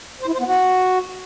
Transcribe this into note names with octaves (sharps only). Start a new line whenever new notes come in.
C5
E4
C5
B3
F#4